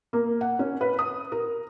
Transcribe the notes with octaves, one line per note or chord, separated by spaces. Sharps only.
A#3
F#5
C#4
B4
D#6
A#4